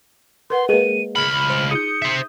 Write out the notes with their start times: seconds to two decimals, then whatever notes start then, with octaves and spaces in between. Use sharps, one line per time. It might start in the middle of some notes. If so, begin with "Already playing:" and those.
0.50 A#4 B4 F#5 C6
0.69 G#3 A#3 G#4 A#4 B4 D#7
1.16 C#2 B5 F6
1.50 C5
1.71 D#4 F4 G#4 D#6 G6 C#7
2.02 C5 E5